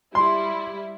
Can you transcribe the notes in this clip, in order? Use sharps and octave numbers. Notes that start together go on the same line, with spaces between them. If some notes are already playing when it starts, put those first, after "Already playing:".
G3 E4 C6